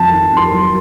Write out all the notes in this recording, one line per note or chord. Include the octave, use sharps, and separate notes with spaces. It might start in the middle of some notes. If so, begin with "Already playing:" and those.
Already playing: F2 A5
D#3
F2 C6
F#3